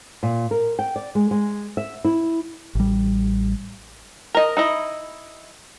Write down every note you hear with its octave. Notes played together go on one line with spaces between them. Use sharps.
A#2
A#4
G5
D5
G#3
G#3
E5
E4
A1 G3
A#4 D#5
D#4 E4 D#5